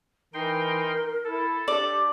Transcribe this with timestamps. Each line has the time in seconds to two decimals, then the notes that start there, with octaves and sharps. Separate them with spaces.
0.34 E3 D#4 A#4 G5 C6
1.24 E4 A4
1.68 D4 G4 D5